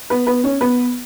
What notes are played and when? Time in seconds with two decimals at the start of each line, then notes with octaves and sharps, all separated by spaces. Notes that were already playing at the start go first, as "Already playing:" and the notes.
0.10 B3 B4
0.27 B3 B4
0.44 C#4 C#5
0.61 B3 B4